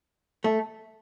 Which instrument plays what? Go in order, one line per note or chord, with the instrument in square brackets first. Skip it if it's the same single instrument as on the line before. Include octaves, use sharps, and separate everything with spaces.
[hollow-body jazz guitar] A3